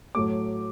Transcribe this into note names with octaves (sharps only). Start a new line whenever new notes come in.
A2 F#3 A3 D6